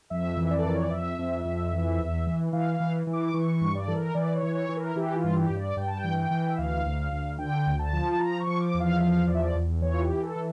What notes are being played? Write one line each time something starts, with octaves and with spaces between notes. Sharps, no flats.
F2 E5
E3
E5
D5
A4
F2 A#4
C#5
D5
F2 E5
F2
F2
E3
E2
E3
E3 F5
F5
E3
E3
D6
D6
E3 C#6
C#6
G2
D5
E3 A4
A#4
E3 D5
C#5
E3
C#5
E3
A#4
E3 G4
F4
G2
G4
G2
D5
G2 G5
A5
G5
E3
G5
E3
E5
D2 F5
D2
D2
D3 G5
D2
A5
F3
A5
F3 A#5
C#6
F3
D6
E2
F5
E5
F3 F5
E2 D5
E5
D5
E2
E3 C#5
F4
G4
E3
A4
E3